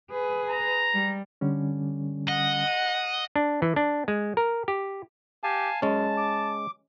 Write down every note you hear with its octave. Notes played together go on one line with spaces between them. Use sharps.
G#4 B4
A#5
G3
D3 G3 C#4
D#5 F#5
D4
E3
D4
G#3
A#4
G4
G4 F5 G#5 A5
F#2 G#3 C#4 A5
D6